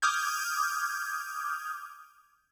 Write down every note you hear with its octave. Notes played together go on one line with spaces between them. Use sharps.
D6 D#6 F6 G6 G#6